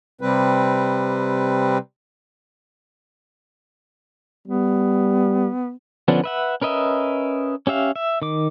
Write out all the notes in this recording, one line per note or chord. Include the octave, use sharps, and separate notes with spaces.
C3 G3 C4 B4
G3 B3
D3 F3 B3 C#4 D4
B4 E5 F#5
C#4 A#4 B4 D#5 E5
C#4 G4 E5 F5
E5
D#3 D6